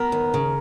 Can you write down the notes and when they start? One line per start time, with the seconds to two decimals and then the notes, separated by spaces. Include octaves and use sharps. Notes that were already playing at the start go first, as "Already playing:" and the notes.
Already playing: B3 A#4
0.12 D#2
0.34 C#3